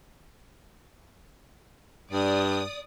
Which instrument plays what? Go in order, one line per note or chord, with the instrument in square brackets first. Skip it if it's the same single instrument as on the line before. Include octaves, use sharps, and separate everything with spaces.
[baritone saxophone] G2 [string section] D5 D#6